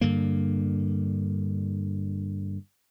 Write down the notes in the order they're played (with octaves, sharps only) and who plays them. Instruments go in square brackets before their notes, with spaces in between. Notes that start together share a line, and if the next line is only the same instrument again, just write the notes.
[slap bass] G2 D3 A#3